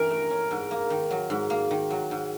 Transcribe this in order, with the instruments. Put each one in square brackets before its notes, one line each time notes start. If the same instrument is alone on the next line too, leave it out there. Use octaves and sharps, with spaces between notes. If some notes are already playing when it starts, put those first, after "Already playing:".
Already playing: [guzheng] E3 C#4 [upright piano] A#4
[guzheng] A3
C#4
G#2
A#3
D#3
F#3
G#2
A#3
D#3
F#3
G#2